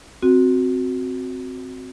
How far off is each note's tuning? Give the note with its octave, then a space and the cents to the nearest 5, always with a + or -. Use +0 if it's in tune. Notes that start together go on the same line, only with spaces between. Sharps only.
C4 +0 F#4 -10